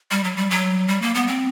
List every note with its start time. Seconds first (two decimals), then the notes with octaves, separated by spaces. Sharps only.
0.11 G3
0.24 F#3
0.36 G3
0.50 F#3
0.88 G3
1.02 A#3
1.14 B3
1.27 C4